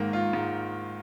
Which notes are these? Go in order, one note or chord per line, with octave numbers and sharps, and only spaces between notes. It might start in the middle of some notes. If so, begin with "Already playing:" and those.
Already playing: G#2 D#3 A#3
F4
G#2